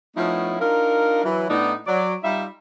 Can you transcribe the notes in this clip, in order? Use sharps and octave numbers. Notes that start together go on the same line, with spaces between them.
F3 A3 B3 C#4 D#4 E4
D4 D#4 F4 A#4
E3 F#3
A2 B3 D4 D#4
F#3 D5
G3 D#4 F4 E5